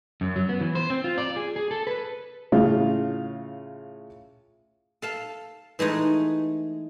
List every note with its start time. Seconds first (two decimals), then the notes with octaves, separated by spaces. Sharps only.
0.21 F#2
0.36 F#3
0.49 B3
0.61 E3
0.75 C5
0.90 C4
1.04 F4
1.18 D5
1.36 G#4
1.56 G#4
1.71 A4
1.87 B4
2.52 A2 C#3 F4
5.02 A4 F5 A5
5.79 E3 G#3 A3 D#4